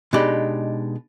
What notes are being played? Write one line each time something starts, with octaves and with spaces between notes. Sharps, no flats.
B2 G#3 D4 D#4 G4 B5